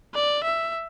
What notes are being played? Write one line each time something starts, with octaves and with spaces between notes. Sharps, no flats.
D5
E5